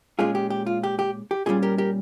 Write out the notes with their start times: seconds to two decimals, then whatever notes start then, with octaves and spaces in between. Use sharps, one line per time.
0.19 A#2 G#3 C#4 F4 G#4
0.35 G4
0.50 G4
0.66 F4
0.83 G4
0.99 G4
1.31 G4
1.46 A#2 G3 C#4 F4 G#4
1.62 G4 A#4
1.78 G4 A#4